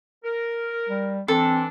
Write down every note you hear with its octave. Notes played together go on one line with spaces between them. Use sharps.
A#4
G3
E3 C4 D4 A4